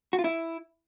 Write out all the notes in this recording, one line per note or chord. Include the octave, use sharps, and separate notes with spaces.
F#4
F4
E4